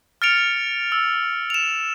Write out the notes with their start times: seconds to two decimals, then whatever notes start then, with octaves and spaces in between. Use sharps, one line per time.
0.22 F6 A6 C#7 D7 F7
0.92 E6
1.50 E7 F7